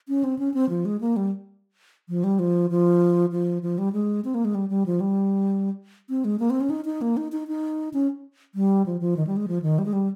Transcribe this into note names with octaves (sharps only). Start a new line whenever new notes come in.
C#4
C4
C#4
C4
F3
G#3
A#3
G3
F3
G3
F3
F3
F3
F3
G3
G#3
C4
A#3
G#3
G3
G3
F3
G3
C4
G#3
A#3
C4
C#4
D#4
D#4
A#3
D#4
D#4
D#4
C#4
G3
F3
F3
D#3
G3
G#3
F3
D#3
G3
G#3
G3